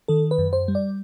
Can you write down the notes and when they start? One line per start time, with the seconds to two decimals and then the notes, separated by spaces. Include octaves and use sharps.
0.08 D#3 A4
0.31 B4
0.38 F#2
0.53 C5
0.68 G3
0.75 D5